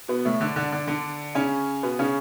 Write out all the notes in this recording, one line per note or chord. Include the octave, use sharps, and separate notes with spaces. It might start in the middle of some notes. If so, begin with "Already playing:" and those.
B2 B3
A2 A3
D3 D4
D3 D4
D3 D4
D3 D4
C#3 C#4
B2 B3
C#3 C#4